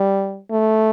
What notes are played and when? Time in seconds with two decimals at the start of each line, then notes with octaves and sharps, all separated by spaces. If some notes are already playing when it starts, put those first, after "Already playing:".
Already playing: G3
0.51 A3